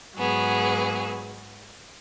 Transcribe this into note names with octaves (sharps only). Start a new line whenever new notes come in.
G#2 F#3 B3 G#4